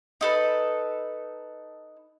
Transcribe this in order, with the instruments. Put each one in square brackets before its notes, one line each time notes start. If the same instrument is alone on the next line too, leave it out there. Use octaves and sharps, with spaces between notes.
[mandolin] D#4 A4 B4